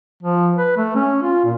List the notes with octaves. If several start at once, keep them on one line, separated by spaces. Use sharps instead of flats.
F3
B4
A3
C#4
F4
A#2